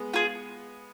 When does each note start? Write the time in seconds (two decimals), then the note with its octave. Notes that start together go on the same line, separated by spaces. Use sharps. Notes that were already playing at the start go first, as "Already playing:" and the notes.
Already playing: G#3 B3
0.14 F4 G#4